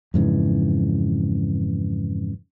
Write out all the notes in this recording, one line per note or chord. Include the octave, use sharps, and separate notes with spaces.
F2 G#2 C#3 E3